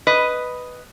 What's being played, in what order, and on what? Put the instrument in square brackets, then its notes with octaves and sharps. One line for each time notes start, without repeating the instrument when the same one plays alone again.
[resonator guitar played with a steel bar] B4 D#5